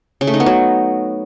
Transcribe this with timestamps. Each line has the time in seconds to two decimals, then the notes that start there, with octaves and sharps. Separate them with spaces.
0.21 C#3
0.27 A3
0.34 D#4
0.40 B3
0.46 F#3